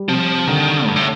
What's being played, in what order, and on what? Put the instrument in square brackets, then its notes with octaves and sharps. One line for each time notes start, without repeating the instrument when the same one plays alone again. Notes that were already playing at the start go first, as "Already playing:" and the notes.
Already playing: [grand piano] G3
[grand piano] C3 [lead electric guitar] F3
[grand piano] D3 [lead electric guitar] D#3
[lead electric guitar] G2 [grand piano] A3
[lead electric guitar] A2